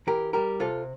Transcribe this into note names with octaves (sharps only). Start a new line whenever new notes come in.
E3 G4 A#4
G3 G4 A#4
C3 F4 A4